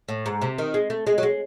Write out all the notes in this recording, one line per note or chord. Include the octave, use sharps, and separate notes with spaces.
A2
G#2
C3
D#3
G#3
A3
G#3
F#3
G#3